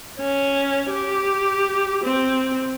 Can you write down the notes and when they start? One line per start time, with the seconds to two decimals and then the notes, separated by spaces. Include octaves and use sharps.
0.20 C#4
0.90 G4
2.04 C4